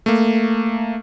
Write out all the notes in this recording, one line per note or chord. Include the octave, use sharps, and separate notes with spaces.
A3 A#3